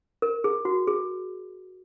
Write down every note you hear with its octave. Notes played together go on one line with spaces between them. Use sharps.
A#4
G#4
F#4
G#4